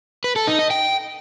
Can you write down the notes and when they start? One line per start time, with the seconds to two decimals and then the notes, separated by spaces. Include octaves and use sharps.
0.24 B4
0.36 A4
0.47 D#4
0.59 D#5
0.71 G5